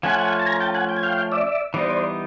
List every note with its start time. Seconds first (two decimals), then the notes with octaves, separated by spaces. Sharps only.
0.03 F3 A3 C#4 F4 F#5 G#5
0.40 A5
0.46 G#5 A#5
0.60 G5 A5
0.74 F#5 G#5
0.89 G5
0.96 G#5
1.03 F5 G5
1.32 D5 E5
1.74 E3 G3 B3 D#4 C5 D5